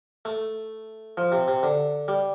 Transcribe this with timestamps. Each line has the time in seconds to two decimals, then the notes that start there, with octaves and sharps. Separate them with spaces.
0.25 A3
1.17 F3
1.32 C3
1.48 C3
1.63 D3
2.08 G3